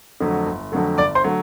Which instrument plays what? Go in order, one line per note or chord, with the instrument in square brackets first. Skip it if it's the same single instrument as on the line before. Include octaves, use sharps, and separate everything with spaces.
[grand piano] F2 D3 F#3 A3
G1
F2 D3 F#3 A3
G1 D5 D6
C5 C6
D3 F#3 A3